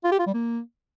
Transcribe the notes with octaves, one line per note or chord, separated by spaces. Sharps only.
F4
G4
F4
G3
A#3